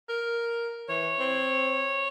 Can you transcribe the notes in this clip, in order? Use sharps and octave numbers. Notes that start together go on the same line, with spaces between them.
A#4
E3 C#5
C4